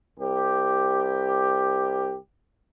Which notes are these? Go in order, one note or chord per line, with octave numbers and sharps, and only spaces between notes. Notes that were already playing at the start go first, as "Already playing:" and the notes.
C2 G4